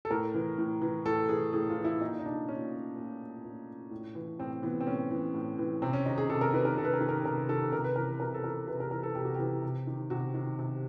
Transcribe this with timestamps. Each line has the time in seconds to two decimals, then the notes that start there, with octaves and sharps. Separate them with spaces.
0.05 A4
0.11 A2 A#4
0.34 E3
0.58 A2
0.82 E3
1.05 A2 A4
1.29 E3 G#4
1.53 A2 G#4
1.70 F4
1.77 E3
1.85 E4
2.00 A#2 D#4
2.19 D#4
2.25 D4
2.48 A#2 C#4
2.96 A#2
3.44 A#2
3.91 A2
4.15 E3
4.39 A2 C4
4.63 E3 B3
4.81 C4
4.87 A2 C#4
5.11 E3
5.34 A2
5.59 E3
5.82 C3 C4
5.93 C#4
6.05 D#3 D#4
6.18 G#4
6.30 C3 A4
6.41 A#4
6.53 D#3 B4
6.65 A#4
6.77 C3 A4
6.85 B4
6.94 A#4
7.00 D#3
7.09 A#4
7.24 C3 A#4
7.49 D#3 A4
7.72 C3 A#4
7.84 B4
7.96 E3 A#4
8.20 C3 A#4
8.34 A4
8.44 E3 A#4
8.67 C3 B4
8.80 A#4
8.91 E3 A#4
9.03 A4
9.15 C3 G4
9.25 F#4
9.34 G4
9.39 E3
9.62 C3
9.87 D#3
10.10 C3 F#4
10.34 D#3
10.59 C3